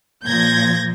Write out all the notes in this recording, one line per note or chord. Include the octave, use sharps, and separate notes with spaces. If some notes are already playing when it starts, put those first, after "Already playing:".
A#2 F3 G6 G#6 A#6